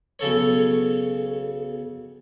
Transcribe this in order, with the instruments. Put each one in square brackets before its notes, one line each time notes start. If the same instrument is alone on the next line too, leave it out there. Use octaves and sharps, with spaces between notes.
[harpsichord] B1 C#3 A4 C#5